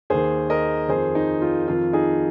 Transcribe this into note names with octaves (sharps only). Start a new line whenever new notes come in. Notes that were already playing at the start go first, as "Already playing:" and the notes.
D#2 D#3 G#4 C5
A#4 D#5
F2 D#3 G#4 C5
D#4
F4
F2 D#3 F4
D#4 G#4